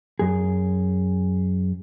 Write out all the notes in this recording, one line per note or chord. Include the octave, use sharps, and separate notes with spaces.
F#2 G#4